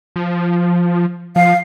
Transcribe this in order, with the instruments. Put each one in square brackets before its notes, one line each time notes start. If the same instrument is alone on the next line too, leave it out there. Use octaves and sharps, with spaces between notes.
[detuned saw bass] F3
[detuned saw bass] F3 [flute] F5